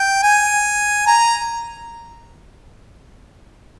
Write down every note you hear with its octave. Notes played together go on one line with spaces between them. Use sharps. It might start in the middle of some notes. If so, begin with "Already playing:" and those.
Already playing: G5
G#5
A#5